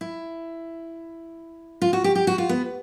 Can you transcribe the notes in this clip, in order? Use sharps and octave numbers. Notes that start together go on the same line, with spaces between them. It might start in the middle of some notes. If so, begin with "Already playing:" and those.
E4
F4
F#4
G4
G4
F#4
F4
B3